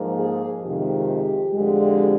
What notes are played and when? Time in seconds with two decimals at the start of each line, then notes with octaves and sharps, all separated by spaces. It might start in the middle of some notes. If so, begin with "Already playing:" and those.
Already playing: G#2 F3 A#3
0.18 G#4
0.63 F2 C3 D#3 G#3 G4
1.52 F2 D3 G#3